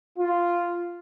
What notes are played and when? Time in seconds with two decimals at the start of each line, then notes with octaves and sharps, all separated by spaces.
0.18 F4